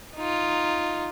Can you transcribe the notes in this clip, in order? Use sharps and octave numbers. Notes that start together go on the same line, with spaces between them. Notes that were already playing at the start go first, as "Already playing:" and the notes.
D#4 F4